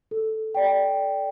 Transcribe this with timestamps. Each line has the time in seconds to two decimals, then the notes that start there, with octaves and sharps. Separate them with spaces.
0.11 A4
0.55 D5 G5